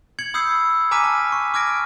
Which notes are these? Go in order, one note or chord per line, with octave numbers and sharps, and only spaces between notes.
G#6 C#7 F#7
B5 D#6 E6 G6 C7 C#7
G#5 A#5 D6 F6 B6 D#7
A5
C#6
D6 F6 G#6 A#6 D7